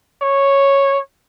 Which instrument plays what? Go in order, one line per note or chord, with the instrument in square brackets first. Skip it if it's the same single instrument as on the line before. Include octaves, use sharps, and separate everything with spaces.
[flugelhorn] C#5